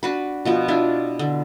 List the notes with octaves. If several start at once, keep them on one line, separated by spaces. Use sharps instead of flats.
D4 F#4 B4
B2 F3 B3
D4 E4 F4
D3